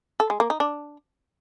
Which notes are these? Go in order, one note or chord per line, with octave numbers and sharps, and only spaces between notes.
A4
G#3
A#3
D#4
D4